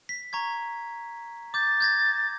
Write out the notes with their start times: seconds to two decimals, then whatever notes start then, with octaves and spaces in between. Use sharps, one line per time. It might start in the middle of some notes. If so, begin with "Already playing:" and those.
0.09 B6
0.33 A#5 C#6 G#6
1.54 D6 G6 A6
1.80 G6 G#6 A#6